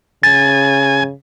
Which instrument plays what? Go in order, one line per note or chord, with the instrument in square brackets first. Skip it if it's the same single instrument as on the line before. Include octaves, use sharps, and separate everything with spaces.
[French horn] C#3 [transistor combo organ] G#5 [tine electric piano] A6